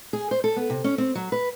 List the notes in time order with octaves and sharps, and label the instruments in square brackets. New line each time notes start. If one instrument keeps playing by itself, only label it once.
[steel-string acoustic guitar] G#4
C5
A4
B3
C3
C#4
C4
F#3
B4